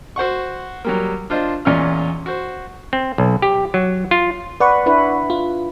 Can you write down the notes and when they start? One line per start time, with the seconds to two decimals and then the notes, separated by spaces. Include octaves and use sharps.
0.16 F#4 C5 F#5 C#6
0.85 F#3 G3 A#3
1.30 D4 F4 C5 D#5
1.65 E2 A#2 C#4 F4 D#5 F6
2.26 F#4 C5
2.93 C4
3.18 B1
3.42 G4
3.74 F#3
4.11 F4
4.60 B4 D5 F#5 C#6
4.86 D4 E4 B4
5.30 F4